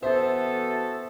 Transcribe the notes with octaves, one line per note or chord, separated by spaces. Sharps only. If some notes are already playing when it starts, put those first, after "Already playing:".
E3 B3 F#4 A4 C5 E5